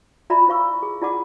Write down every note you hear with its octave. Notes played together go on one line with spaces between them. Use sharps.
F4 D5 E5 A#5 B5
E4 C5 F5 C#6 E6
G#4
E4 F4 D5 F#5 A5 D6